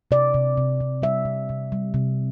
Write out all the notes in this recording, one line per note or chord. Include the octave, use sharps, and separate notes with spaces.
C3 D5
C3
C3
C3
G3 E5
C3
C3
G3
C3